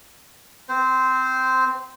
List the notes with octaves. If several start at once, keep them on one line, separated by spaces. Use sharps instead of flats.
C4 C5